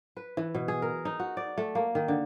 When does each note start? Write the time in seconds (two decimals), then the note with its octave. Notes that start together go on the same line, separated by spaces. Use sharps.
0.17 B4
0.37 E3
0.55 B2
0.68 G#4
0.82 A#4
1.05 D#4
1.20 F#4
1.37 D5
1.58 A3
1.75 A#3
1.95 D#3
2.08 D3